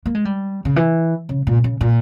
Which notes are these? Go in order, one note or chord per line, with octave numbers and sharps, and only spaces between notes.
A#3
G#3
G3
C#3
E3
C#3
A#2
C#3
A#2